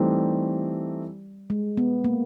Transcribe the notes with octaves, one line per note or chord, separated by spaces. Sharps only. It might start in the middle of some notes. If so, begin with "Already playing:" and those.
Already playing: E3 G3 A3 C4 D#4 G4
G#3
B3
A#3